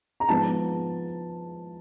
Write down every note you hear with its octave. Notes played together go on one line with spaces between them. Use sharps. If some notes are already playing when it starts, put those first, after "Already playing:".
A#5
G#2 F3 G#3 B3 A5